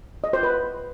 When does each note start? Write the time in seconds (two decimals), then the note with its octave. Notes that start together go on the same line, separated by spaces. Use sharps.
0.24 D#5
0.33 C5
0.43 B4